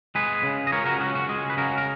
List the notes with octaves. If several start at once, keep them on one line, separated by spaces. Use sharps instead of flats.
G#3 G#4 B4
C#3
D#5
C#2 A#4 C#5
F#4 A#4
C#4 F#4
F#4
G#3 G#4
B4
C#3 F#4 A#4
A#4